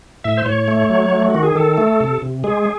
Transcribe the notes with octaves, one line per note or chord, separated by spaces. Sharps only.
A2 E5
C5
A2 C#5
A3
F#3
A3
D#3 F#4
G#4
D#3 A4
A3
C3
C3
G#3 G#4